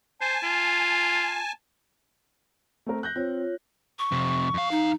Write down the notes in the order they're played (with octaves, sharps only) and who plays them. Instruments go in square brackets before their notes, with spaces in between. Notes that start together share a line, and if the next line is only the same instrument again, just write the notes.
[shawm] C5 [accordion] G#5 A5
[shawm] F4
[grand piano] A3 C4 A#4
F#6 G6 A#6
[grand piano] C4 [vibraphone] F4 C#5
[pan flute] C#6
[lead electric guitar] F2 C3
F2 F5
[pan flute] D#4